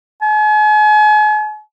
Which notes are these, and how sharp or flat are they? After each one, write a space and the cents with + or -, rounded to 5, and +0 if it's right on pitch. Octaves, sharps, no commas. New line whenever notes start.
G#5 +40